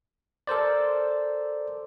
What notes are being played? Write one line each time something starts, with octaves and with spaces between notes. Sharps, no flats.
A4 A#4 C5 D5